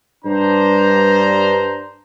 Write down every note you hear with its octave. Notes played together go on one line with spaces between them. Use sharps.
G2 D4 C5 A#5